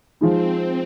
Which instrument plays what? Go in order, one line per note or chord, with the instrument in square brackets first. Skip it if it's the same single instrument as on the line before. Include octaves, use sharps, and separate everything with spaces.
[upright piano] F3 G#3 D#4 [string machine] C4